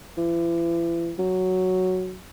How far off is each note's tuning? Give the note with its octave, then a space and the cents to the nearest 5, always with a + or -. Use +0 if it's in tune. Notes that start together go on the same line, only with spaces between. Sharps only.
E3 +40
F#3 +0